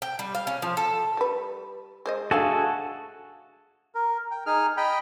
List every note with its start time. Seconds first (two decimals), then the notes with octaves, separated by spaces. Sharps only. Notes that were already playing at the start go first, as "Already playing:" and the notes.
0.02 G5
0.19 G3
0.35 F5
0.47 C#4
0.62 F3
0.77 A4
1.17 G3 B4
2.06 G#3 C5 D#5
2.31 A3 D4 F#4 G#4 A4 F5
3.95 A#4
4.31 G5
4.46 D#4 G#4 F6
4.77 D#5 G5 B5